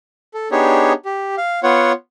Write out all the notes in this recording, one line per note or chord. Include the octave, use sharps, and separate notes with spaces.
A4
B3 D4 D#4 G4 G#4 C#5
G4
F5
B3 F4 C#5 F#5